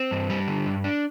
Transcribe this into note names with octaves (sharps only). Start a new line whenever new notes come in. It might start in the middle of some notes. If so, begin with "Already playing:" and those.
Already playing: C4
G2
G3
D3
G2
D4